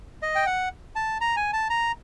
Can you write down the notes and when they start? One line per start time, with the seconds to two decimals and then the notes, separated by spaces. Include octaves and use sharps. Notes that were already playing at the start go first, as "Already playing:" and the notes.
0.22 D#5
0.35 G5
0.47 F#5
0.96 A5
1.21 A#5
1.36 G#5
1.53 A5
1.70 A#5